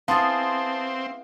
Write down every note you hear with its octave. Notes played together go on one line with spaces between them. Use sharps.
B3 C4 E4 G#4 F5 A5 C6 A6